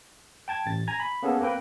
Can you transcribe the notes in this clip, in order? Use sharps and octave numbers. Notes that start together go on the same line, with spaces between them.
G5 A5 G#6
A1 A6
G#5 A#5 G#6
B5
A#3 B3 C#4 G#4 A4
A#3 C4 B4 G5